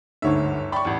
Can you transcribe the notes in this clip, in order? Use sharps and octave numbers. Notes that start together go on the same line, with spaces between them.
G1 D2 G#2 C#5 E5
D5 G5 B5 C#6
A1 E2